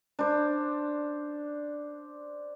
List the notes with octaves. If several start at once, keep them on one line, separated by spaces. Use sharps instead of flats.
D4 C5